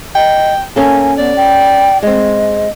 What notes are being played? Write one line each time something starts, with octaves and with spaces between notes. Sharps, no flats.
D#5 G5
A#3 C#4 A4 G#5
B3 D5
G5
G#3 C4 D#5